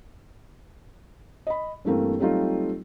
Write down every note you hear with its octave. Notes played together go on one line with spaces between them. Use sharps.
D#5 B5
G2 E3 A3 A#3 C4
F#3 G3 A3 C4 D#4 F4